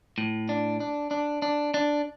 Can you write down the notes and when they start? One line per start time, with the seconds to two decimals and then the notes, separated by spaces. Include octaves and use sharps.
0.18 A2
0.49 D4
0.80 D4
1.11 D4
1.42 D4
1.74 D4